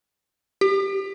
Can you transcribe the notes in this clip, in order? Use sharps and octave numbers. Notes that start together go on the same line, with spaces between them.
G4